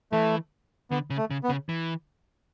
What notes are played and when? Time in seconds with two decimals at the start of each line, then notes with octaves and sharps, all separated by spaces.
0.12 E3 A3
0.91 D3 B3
1.10 C#3
1.17 A3
1.31 C#3
1.43 B3
1.49 C#3
1.69 E3